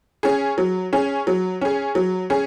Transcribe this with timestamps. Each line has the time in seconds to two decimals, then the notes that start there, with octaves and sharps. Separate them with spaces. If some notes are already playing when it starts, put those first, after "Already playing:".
0.23 C#4 G#4
0.58 F#3
0.93 C#4 G#4
1.27 F#3
1.61 C#4 G#4
1.95 F#3
2.30 C#4 G#4